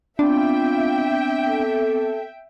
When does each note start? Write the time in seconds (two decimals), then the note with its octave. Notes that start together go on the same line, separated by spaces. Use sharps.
0.19 B3 C4 D4 F4 E5 G5 D6
1.46 A4